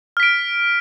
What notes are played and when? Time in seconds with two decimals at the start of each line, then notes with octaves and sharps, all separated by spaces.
0.17 F6
0.20 B6
0.23 D7